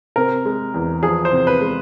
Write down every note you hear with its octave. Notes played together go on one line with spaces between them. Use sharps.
C3 A#4
G#3
E2
F3 G#4
C5
C3
B4
G#3